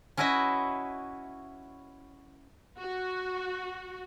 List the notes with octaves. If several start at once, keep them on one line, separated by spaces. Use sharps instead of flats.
C#4 E4 F#4 B4 D#5 E5
F#4